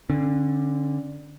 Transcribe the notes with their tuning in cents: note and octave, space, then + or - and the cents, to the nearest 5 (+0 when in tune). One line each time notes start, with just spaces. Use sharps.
D3 +0 C#4 -35